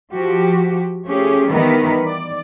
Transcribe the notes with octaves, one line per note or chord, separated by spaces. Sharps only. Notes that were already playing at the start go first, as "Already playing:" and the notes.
F3 F#4 G4
F3 A3 C#4 G4 G#4
D#3 E3 G3 B3 A#4 B4
D5